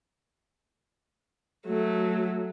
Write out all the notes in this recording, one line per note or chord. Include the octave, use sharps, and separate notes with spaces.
F#3 A3